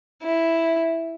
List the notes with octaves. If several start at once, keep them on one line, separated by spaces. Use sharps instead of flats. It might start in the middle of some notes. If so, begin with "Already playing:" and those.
E4